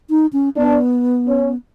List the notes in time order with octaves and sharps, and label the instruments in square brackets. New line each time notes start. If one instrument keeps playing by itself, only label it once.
[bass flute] D#4
C#4
[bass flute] B3 [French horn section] D4
[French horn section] C#4